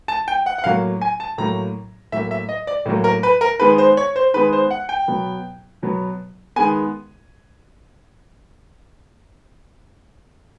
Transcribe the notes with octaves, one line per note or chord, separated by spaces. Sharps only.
A5
G5
F#5
F#5
A2 F#3 A#3 F5
G#5
A5
A2 F#3 A#3 A#5
A2 F#3 A#3 E5
E5
D#5
D5
A2 F#3 A#3
A#4
B4
A#4
D#3 G#3 B3 B4
C5
C#5
C5
D#3 G#3 B3 B4
C5
F#5
G5
B2 F#3 B3
B2 F#3 B3
D#3 G#3 B3 G#5